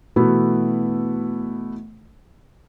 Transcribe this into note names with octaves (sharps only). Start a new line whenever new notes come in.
B2 E3 A3 B3 E4 F#4